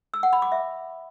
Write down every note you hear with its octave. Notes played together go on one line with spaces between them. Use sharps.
E6
F#5
B5
D6
E5